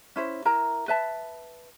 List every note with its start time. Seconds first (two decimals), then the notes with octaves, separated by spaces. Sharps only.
0.16 C#4 E4 C5
0.45 E4 A#4 A#5
0.88 B4 E5 A5